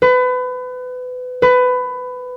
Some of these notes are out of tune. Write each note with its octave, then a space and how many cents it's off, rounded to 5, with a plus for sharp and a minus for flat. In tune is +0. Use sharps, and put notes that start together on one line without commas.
B4 +30
B4 +20